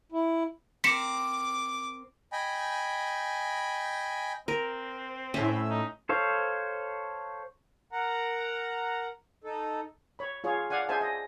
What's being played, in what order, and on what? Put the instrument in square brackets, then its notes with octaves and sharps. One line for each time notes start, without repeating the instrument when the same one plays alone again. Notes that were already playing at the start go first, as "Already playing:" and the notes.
[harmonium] E4
[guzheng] C4 A#4 [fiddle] D6 [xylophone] B6 C#7 E7
[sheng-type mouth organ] D#5 G5 G#5 B5
[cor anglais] C4 [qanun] A#4
[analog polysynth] A2 E5 [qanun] C#4
[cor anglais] D#4
[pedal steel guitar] A4 C5 C#5 F5
[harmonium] A#4 F#5 A#5
D#4 A4
[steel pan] C#5 B5
F4 G#4 C#5
D5 F5 F#5 G#5
G#4 C5 E5 G#5 A5
D#5